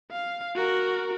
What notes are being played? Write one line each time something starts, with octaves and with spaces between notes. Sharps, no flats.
F5
F#4 A#4